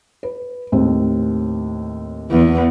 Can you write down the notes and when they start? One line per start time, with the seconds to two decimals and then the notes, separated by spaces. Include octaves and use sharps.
0.23 B4
0.72 D#2 A2 C4
2.31 E2